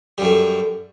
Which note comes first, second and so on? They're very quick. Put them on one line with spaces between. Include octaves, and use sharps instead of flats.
G3 F#2 A3